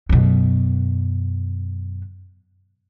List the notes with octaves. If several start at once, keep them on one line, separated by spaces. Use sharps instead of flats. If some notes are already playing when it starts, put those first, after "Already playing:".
F#2 B2